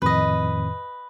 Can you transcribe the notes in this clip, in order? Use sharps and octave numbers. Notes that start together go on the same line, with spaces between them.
F2 A2 D#3 B4 D#5